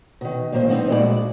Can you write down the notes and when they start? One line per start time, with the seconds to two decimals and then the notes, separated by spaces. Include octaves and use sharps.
0.21 B2 D#3
0.52 A#2 D#3 A#3 C5 F5
0.69 F3 B3 C4 D#4
0.89 G2 A#2 G#3 F#4 A4 D5